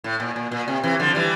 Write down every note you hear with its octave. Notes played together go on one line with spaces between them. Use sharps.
A2
A#2
A#2
A#2
C3
C3 E3
D3 F3
E3 G3